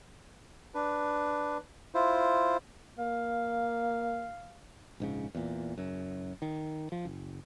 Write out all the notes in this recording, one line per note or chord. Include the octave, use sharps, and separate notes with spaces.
D4 B4
E4 F4 C5
A#3 F5
A#1 G#2 C#3
E2 A#2
F#1 F#2
D#3
F3
F#1